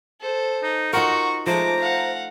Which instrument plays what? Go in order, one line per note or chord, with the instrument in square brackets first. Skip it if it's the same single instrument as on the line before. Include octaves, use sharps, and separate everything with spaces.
[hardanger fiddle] A4 C5
[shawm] D#4
[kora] D#4 F4 A#4 [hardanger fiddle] F#4 [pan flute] F#5 [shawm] C#6
[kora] F3 A3 [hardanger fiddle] G#3 D6 [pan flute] C5 [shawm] A#5
[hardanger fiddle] F5 F#5